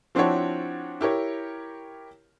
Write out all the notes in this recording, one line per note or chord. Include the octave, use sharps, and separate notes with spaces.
F3 C4 D4 E4 F#4 C#5
E4 G4 A#4 C#5